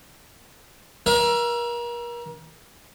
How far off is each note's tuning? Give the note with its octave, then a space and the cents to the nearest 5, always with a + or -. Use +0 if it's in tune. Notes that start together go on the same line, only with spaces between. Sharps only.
A#4 +35 E5 +35